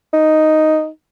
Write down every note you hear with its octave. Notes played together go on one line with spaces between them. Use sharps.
D#4